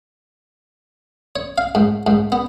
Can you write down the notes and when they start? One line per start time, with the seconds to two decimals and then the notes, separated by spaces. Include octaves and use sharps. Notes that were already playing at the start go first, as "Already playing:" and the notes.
1.36 C#5
1.58 F5
1.75 G#2
2.07 G#2
2.32 B3